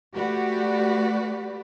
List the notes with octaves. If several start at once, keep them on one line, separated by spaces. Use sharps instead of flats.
A3 F#4 G4 B4 D5